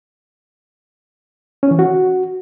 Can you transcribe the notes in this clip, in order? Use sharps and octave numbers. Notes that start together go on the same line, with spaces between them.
C#4
E3
F#4